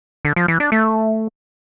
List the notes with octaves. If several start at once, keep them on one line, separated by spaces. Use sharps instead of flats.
D3
F3
E3
D4
A3